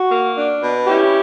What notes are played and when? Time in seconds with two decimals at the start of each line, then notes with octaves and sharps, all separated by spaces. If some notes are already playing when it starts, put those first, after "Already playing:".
Already playing: F#4
0.11 A#3
0.36 D4
0.62 B2
0.87 C#4 E4 G4